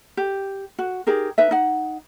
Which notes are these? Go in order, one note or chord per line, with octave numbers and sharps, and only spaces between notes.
G4
F#4
D#4 G4 G#4 A#4
D#4 B4 E5
D#4 F#5